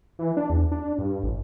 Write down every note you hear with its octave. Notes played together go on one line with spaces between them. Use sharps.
E3
D4
E2
D4
G2
A1